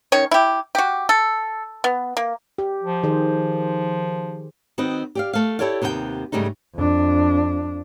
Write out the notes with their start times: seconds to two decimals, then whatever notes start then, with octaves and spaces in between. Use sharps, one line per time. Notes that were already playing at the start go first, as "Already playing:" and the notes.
0.12 D#3 C#4 C#5
0.31 E4 G4
0.75 F#4 G4
1.09 A4
1.84 B3
2.17 A#3
2.58 G4
2.83 F3
3.03 D#3 G#4 C5
4.78 D#3 C4 F#4 B4 D#5
5.15 G4 D5 F5
5.33 A3 F5
5.59 E4 G4 A4 C#5 D5 F5
5.82 D#2 C3 B3 G4 G5
6.32 G#2 C#3 G3 A3 D#4
6.76 F2 D4